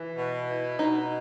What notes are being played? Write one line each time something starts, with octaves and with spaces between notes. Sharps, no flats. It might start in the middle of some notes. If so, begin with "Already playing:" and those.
Already playing: E3
B2
E4
B2 D#4